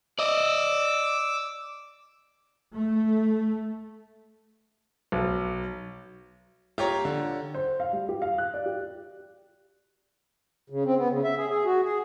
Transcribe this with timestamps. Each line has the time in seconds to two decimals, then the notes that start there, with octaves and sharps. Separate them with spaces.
0.19 D5 D#5 D6 E6
2.74 A3
5.12 B1
6.78 F4 G4 C#5 A#5
7.05 D3
7.54 C5
7.80 F5
7.93 G3
8.09 G4
8.22 F5
8.38 F#6
8.54 D5
8.66 G4
10.70 C#3
10.85 C4
10.97 B3
11.09 C#3
11.24 E5
11.37 G#4
11.49 G#4
11.65 F#4
11.84 G#4